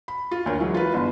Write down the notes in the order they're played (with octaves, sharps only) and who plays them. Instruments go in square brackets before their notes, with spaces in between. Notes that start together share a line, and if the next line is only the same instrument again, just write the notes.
[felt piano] B5
F4
D2 A#3 A#4 C#5
E3 F#3 G#3
F4 B4
G1